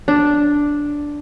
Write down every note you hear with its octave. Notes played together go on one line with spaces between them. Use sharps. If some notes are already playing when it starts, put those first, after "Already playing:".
D4